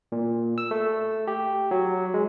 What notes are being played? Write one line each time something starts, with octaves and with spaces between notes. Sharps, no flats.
A#2
E6
A3
G4
F#3
G#3